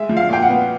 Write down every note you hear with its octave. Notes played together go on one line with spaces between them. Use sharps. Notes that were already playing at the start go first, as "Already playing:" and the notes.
Already playing: G#3 E5
F3
F5
A#2 G5
F#5
B3